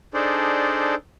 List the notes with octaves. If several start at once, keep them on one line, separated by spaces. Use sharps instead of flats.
D4 D#4 G#4 A4 C5 D5